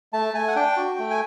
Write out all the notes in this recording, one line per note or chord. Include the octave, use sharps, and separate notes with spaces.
A3 A5
A3 G#5
F#5
D4 G5
F#4
A3
G#5